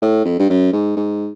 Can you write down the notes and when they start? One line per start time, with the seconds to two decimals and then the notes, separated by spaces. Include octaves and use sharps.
0.02 A2
0.25 F2
0.39 G2
0.50 F#2
0.73 G#2
0.97 G#2